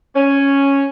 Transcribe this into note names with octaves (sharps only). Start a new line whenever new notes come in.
C#4